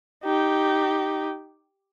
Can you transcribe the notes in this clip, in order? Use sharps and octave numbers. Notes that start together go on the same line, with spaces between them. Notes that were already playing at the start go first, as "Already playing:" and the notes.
D#4 G4